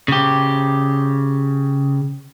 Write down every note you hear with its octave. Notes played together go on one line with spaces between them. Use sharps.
C#3 G4